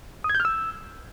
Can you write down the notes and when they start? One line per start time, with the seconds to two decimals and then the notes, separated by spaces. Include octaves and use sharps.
0.24 D#6
0.30 G#6
0.35 G6
0.40 F6
0.45 E6